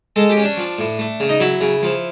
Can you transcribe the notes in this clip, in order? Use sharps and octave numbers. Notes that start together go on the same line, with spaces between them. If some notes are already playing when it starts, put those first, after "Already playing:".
G#3 A4
G4
C#4
D4
F3
A2
A3
C#3
D#4
F#3 E4
C#3
F3